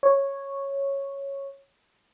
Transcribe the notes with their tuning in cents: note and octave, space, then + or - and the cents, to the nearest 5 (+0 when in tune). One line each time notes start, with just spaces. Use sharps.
C#5 -5